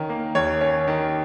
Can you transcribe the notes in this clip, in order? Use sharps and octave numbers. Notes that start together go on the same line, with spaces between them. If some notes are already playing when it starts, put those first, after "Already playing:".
Already playing: D#3 C#4
A#3
D#2 C#5
C#4
D#3